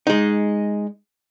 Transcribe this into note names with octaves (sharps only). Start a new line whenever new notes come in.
G#3 D#4